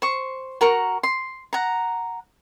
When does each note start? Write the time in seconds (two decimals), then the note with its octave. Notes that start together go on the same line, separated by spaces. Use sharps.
0.02 C5 C#6
0.61 F#4 A#4 A#5 C#6
1.03 C6
1.53 F#5 A#5